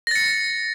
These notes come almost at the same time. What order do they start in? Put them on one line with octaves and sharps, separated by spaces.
A#6 A6 C#7